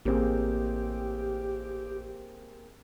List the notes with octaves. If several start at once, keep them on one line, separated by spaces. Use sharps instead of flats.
A1 A#3 C4 G4 G#4